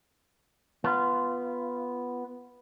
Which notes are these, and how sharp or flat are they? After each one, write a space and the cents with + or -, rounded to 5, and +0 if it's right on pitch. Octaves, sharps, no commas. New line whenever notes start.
B3 +0 F4 -15